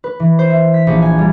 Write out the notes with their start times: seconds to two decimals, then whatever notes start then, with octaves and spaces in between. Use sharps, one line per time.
0.04 B4
0.20 E3
0.39 C5
0.50 E5
0.74 B6
0.87 A#1
1.02 G#5
1.19 G3